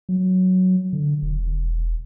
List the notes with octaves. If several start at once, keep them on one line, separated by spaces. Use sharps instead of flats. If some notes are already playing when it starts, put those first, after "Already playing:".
F#3
D3
E1